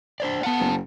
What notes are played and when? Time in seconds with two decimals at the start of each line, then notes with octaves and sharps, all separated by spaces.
0.20 D4 C5 D5
0.43 B3 F4 A4 F#5
0.60 F#1